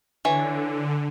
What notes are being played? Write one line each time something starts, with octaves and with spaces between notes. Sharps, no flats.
D3 E3 C#5